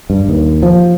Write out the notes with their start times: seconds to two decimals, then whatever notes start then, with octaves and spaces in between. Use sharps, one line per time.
0.10 G2
0.28 D#2
0.63 F3